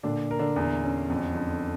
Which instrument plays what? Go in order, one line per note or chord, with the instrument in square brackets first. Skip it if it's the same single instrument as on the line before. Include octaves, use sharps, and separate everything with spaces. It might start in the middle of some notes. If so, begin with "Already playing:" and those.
[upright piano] A#2 [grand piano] D3 D4
[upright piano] A#4
[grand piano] D3 D4
[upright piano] E2
C#4
F2
F2